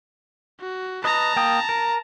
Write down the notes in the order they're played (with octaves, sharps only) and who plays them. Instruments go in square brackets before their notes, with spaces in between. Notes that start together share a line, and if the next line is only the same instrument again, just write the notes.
[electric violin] F#4
[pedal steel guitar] B4 D#5 [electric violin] A5 A#5
[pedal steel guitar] A#3 G5 D#6
A#4